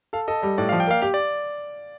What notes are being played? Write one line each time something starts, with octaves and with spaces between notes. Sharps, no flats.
A4 F5
A4 D#5
G3 D#5
A2 D5
F5
F3
G5
A#3 F5
G4 F5
D5